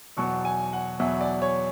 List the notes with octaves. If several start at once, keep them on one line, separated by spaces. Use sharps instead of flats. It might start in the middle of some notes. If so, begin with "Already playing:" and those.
E2 B2 F#3 C#6
G#5
F#5
E2 B2 F#3 E5
D5
C#5